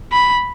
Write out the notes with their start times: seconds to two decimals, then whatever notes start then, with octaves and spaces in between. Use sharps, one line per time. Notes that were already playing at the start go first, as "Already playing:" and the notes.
0.12 B5